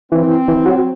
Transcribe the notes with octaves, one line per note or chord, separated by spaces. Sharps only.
E3 C4
E3
F#3